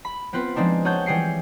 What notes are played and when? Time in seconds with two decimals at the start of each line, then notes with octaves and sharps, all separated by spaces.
0.05 B5
0.33 B3 C4 F4 B4
0.56 F3 G#3 C4 D4 D#4
0.85 G#4 C#5 F#5 A5 G6
1.06 E3 G3 G#4 G5 C7 C#7